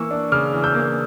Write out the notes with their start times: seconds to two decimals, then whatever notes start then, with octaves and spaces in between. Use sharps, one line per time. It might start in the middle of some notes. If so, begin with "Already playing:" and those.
Already playing: E3 A#3 C#6 E6
0.11 D4
0.32 C#3 D6 F6
0.53 E3
0.64 E6 G6
0.74 A#3